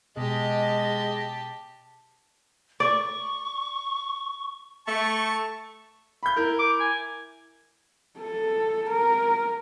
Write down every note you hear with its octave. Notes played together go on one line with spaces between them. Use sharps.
B2 G#3 G4 D#5 A5
D5 C#6
A3 A5 C#6
B5 G6
E4 A#4
D6
G#5
A4
A#4